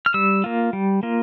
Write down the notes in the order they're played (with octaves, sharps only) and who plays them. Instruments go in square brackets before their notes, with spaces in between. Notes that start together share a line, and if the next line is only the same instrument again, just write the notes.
[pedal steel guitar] F6
G3 E6
A#3 F4
G3
A#3 F4